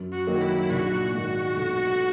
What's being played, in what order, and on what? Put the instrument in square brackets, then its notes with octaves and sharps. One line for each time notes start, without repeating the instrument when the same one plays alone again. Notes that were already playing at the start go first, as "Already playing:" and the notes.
Already playing: [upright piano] F#2
[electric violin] F#4
[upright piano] D#3 F#3 A#3
[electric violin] E4
[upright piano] A#1 [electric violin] F#4
[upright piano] G#2 D#3 A#3 [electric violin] F#4
[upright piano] B1